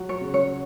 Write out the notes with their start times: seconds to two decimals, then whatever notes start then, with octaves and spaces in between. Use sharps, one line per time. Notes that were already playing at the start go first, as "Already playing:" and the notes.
Already playing: F#3 F#4
0.09 C#5
0.21 C#3
0.34 C#5